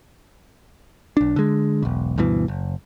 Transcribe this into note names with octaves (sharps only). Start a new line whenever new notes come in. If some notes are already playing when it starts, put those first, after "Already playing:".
B1 D4
D3 G#3
E1 B1
D2 G2 B2 E3
F#1